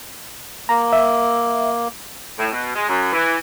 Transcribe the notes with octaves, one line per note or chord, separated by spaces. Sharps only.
A#3 A#5
E5
A2
B2
G#3
F#2
E3